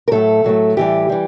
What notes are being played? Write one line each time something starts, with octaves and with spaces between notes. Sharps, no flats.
A#4
A2 F#3 A3 A4
A2 F#3 A3
A2 E3 G3 G4
E3 G3